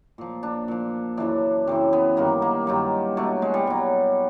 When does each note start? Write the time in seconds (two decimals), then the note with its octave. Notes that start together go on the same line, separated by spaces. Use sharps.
0.18 A#2 F3
0.43 D4
0.68 A#2 F3
1.17 F#2 C#3 E3 D4
1.67 F#2 C#3 E3 C4
1.93 B3
2.17 G2 D#3 F#3 A#3
2.42 A#3
2.67 G2 D#3 F#3
3.17 B2 F#3 A3
3.42 G#3
3.54 G3
3.67 B2 F#3